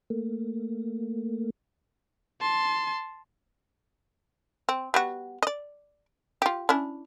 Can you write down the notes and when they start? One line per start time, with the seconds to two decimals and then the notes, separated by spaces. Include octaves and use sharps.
0.10 A3 A#3
2.42 A5 C6
4.69 C4
4.94 G3 B3 F#4
5.43 D5 D#5
6.42 F4 G4
6.69 C#4 D4 E4